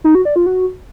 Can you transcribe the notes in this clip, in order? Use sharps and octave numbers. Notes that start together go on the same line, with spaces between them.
D#4
F#4
D5
F4
F#4